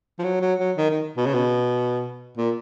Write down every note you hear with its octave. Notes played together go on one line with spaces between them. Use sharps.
F3
F#3
F#3
F#3
D#3
D#3
B2
C#3
B2
A#2